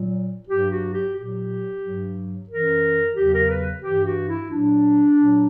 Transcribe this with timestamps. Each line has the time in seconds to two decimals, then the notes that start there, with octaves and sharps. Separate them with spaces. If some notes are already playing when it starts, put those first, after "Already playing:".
Already playing: A#2 F#3
0.48 G2 F#3 G4
0.70 F#4
0.93 G4
1.15 A#2 F#3 G4
1.82 G2 F#3
2.48 F#2 E3 A#4
3.16 E2 C#3 F#3 G4
3.32 A#4
3.50 B4
3.82 G2 E3 G4
4.05 F#4
4.27 E4
4.49 A#2 F#3 D4
5.16 A#2 F#3